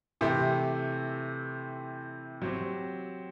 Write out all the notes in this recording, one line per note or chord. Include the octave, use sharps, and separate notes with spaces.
C3 E3 A3 E4 G4
F#3 C4 G4